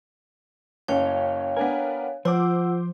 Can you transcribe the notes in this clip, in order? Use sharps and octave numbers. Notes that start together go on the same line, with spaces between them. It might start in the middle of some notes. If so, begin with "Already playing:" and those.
F#1 C#4 C#5 F5 G5
B3 D4 A#4 G#5
F3 F4 C5 F#5 D6 E6